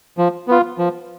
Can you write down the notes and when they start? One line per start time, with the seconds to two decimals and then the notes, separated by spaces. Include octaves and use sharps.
0.18 F3
0.48 B3 F4
0.78 F3